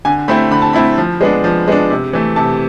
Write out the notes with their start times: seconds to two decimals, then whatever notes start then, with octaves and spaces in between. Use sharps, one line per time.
0.05 D3 G#5
0.28 A3 C4 E4 B5
0.51 D3 B5
0.62 A5
0.73 A3 C4 E4 B5
0.98 F3
1.21 G#3 B3 D4
1.44 F3
1.68 G#3 B3 D4
1.90 C3
2.13 E3 A3
2.36 C3 A5